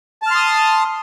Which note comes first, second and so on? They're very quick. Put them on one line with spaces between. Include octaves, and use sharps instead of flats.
A5 F6 C6 D#6